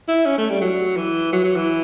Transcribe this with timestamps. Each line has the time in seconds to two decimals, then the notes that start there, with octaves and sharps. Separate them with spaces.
0.08 E4
0.26 C#4
0.38 A3
0.50 G3
0.61 F#3
0.97 E3
1.33 F#3
1.44 F#3
1.56 E3